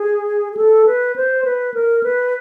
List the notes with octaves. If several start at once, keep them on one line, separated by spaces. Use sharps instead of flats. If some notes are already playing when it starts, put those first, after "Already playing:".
Already playing: G#4
G#4
A4
B4
C5
B4
A#4
B4